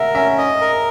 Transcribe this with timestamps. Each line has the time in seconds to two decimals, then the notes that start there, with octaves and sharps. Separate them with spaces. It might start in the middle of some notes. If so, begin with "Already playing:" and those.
Already playing: A#4 E5 F#5
0.15 C#4 E5
0.38 D#5
0.61 A#4